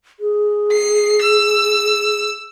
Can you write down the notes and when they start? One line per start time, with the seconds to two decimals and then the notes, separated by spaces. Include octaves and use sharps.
0.20 G#4
0.73 C7
1.22 E6